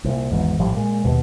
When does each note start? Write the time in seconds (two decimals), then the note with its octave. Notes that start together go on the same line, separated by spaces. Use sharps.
0.04 C2 A#2
0.32 G#1 E2 G#2
0.59 A#1 A2 F3 G3
0.75 A#2 G#3
1.04 D#2 B2